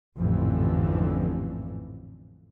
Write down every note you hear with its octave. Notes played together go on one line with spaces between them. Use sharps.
A1 F2 G#2 D3 E3